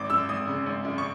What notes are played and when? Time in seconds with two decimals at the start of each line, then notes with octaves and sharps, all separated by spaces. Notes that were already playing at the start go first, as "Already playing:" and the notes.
Already playing: G#1 D6
0.10 F#2 E6
0.29 G#1 D#6
0.47 C#3
0.66 G#1
0.85 F#2
0.98 C#6